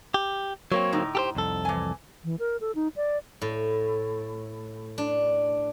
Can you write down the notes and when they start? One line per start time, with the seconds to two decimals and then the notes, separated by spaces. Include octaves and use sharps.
0.14 G4
0.72 F#3 A#3 C4 C#5
0.93 A2 D3 D#4
1.15 G4 A4 C5
1.35 C2 F2 A4
1.65 E3 G#5
2.24 E3
2.39 A#4
2.61 A4
2.75 D#4
2.96 D5
3.42 A2
4.98 D4